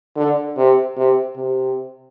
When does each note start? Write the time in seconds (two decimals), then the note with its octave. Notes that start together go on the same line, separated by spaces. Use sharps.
0.17 D3
0.57 C3
0.96 C3
1.36 C3